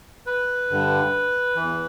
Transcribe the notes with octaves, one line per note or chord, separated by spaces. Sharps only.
B4
G2 D3
E3
E2